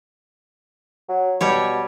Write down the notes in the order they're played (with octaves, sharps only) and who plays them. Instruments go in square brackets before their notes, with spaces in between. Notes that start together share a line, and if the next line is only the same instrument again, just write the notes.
[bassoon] F#3
[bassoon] B2 [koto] G3 G4 C#5